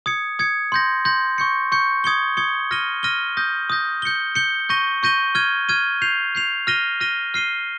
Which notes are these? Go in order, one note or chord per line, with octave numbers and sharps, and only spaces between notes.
D#6 G#6 C#7
D#6 G#6 C#7
C6 G6 A#6
C6 G6 A#6
C#6 G6 C#7
C#6 G6 C#7
D#6 G#6 C#7 G7
D#6 G#6 C#7 G7
F6 A#6 D#7 G7
F6 A#6 D#7 G7
D#6 G6 A#6
D#6 G6 A#6
G6 C#7 G7
G6 C#7 G7
C#6 G6 A#6 D#7 G7
C#6 G6 A#6 D#7 G7
F6 G#6 D#7 G7
F6 G#6 D#7 G7
G6 C7 F7
G6 C7 F7
F6 A#6 D#7 G7
F6 A#6 D#7 G7
F6 C7 D#7 G7